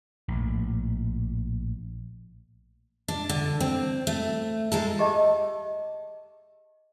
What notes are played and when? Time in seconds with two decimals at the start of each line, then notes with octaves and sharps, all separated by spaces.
0.28 A#1 A2
3.08 D4
3.29 D3
3.60 C4
4.07 A3
4.72 G#3 D#4 A4
4.99 G4 G#4 D#5 E5 A5